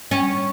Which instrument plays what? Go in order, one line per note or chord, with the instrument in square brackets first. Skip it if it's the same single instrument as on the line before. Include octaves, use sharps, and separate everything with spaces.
[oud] C#4